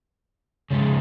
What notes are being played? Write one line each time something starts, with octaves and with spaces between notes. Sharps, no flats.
C#3 F3 G#3